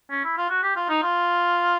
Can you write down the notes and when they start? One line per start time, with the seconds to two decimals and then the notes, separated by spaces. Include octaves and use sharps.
0.10 C#4
0.24 E4
0.37 F4
0.50 F#4
0.63 G4
0.76 F4
0.89 D#4
1.03 F4